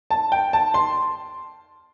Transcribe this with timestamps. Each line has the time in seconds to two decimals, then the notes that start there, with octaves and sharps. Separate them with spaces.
0.11 A5
0.32 G5
0.53 A5
0.74 C6